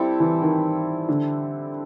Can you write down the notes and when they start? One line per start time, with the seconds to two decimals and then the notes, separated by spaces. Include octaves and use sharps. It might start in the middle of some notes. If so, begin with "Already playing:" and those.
Already playing: G3 C4 E4 A4
0.20 E3
0.42 D#3
1.09 D3